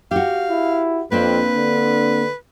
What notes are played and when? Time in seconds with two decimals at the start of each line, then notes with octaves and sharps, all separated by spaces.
0.11 F#4 G4 F5
0.50 E4
1.12 F2 A#3 C4 D4 B4
1.57 D3